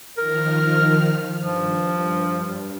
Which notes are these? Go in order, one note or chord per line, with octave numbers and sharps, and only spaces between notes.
D#3 F3 A#4 F6
G2 F3